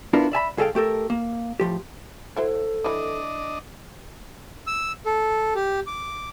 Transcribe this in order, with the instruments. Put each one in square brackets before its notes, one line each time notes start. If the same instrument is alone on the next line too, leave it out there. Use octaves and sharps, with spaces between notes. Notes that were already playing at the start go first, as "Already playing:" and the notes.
[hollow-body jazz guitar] B3 D4 E4 F4 A#4
D5 E5 G#5 B5
C2 G#4 A4 D#5 F5 G5
A3 G4 A4 A#4
A#3
A2 C3 F3 G4
[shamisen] F#3 E4 C5 [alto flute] A4
[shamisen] E3 E4 [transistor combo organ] D4 D#5
[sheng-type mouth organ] E6
A4
G4
D6